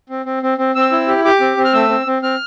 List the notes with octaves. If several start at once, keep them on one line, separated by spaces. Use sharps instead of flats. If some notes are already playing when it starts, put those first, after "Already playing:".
C4
C4
C4
C4
C4 E6
E4
G4
G4 D6
C4
C4
F6
A3 E6
C4
C4
C4 F6